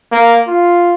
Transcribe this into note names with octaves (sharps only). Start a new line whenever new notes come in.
A#3
F4